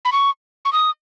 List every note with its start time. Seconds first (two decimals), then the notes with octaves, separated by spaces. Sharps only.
0.05 B5
0.12 C#6
0.65 C#6
0.73 D#6